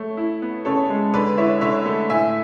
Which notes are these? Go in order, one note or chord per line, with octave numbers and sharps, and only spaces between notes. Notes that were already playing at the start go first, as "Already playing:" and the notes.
Already playing: A3 C#5
E4
B3
C#3 A4 C#5
G#3
D3 B4 D5
E4 C#5 E5
D3 C#5 E5
A3
A2 E5 G#5